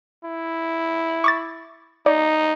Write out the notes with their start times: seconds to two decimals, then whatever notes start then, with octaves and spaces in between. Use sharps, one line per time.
0.25 E4
1.24 C#6 D6 A6
2.06 D#4 D5